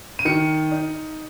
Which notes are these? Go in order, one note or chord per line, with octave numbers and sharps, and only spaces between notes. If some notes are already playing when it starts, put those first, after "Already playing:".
D#7
D#3 C#7
D#4